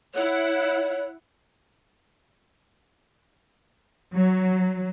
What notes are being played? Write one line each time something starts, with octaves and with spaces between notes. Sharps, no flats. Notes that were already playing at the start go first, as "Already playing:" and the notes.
E4 C#5 F#5
F#3